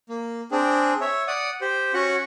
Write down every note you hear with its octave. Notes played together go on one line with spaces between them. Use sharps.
A#3
C4 D4 G#4
C#5 E5
D5 F#5 D#6
G4 C5
C#4 F#4 F#5